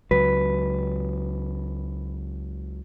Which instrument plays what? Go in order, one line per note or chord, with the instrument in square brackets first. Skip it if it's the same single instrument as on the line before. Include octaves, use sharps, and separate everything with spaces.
[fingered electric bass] C#2 F#3 [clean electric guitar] B4